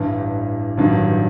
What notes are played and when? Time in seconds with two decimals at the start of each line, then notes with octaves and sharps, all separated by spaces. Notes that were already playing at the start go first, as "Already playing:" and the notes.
Already playing: A1 G2 E3
0.78 A1 G2 D#3 F#3